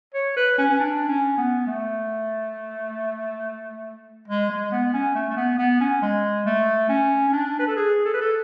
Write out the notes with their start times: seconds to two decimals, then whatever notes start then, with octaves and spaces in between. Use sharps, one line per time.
0.14 C#5
0.36 B4
0.58 C#4
0.69 C#4
0.80 D4
1.08 C#4
1.37 B3
1.67 A3
4.28 G#3
4.50 G#3
4.72 B3
4.93 C#4
5.15 A3
5.30 A3
5.37 B3
5.58 B3
5.80 C#4
6.02 G#3
6.46 A3
6.89 C#4
7.29 C#4
7.33 D4
7.59 B4
7.68 A4
7.76 G#4
8.05 A4
8.13 B4
8.21 A4